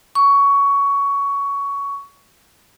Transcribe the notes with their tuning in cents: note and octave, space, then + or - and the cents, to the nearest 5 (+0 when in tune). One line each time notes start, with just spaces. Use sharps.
C#6 +15